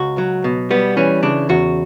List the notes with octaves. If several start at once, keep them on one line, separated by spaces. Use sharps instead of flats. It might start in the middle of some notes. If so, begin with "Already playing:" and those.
Already playing: C#2 F#4
F#3
B2
G3 B3
E3 C#4
C#3 D4
E2 F#4